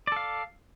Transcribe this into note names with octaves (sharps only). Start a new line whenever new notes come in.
A4 D5 F5